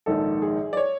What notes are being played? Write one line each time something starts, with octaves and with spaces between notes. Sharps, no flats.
A#1 G#2 D#3 A4
G#4
D5
C#5